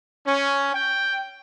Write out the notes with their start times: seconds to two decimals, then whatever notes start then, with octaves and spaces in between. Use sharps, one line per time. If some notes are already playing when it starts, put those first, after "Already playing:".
0.24 C#4
0.73 G5